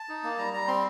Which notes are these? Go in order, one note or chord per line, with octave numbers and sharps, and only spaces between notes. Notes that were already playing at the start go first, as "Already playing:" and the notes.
Already playing: A5
D#4
A#3
G3 A#5
G3 A#5
C4 C6